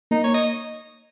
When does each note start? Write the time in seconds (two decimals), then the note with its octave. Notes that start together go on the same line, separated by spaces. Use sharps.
0.11 A#3 D#4
0.24 C#5
0.34 D#5